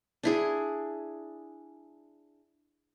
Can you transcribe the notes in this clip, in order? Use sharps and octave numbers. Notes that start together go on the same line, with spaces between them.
D4 E4 G#4